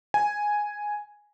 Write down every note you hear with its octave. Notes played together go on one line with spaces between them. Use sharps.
G#5